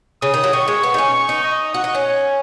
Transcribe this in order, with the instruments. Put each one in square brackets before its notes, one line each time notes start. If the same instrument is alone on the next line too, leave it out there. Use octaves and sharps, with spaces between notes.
[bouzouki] C#3 [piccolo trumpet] D#6
[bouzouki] D#3
F#3
[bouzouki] D#3 [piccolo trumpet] C#6
[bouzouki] G#3
B3
D#4
C#4
[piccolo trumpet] C#6
[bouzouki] D#4
[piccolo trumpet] D#5
[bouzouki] F#4 [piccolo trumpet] F#5
[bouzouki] D#4
C#4
[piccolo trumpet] G#5